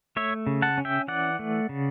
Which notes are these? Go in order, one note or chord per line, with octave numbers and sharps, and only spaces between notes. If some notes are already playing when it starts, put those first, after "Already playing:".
A3 C#5 E5
C#3
F#5 A5
C#4
E5 G5
E3 D5 F#5
A3
C#3